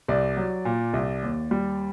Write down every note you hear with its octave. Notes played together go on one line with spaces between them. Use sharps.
C2 D5
F#3
A#2
C2
D#2
G3